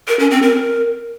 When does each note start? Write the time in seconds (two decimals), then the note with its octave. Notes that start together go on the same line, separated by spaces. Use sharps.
0.08 A#4
0.19 C#4
0.31 C4
0.42 A#4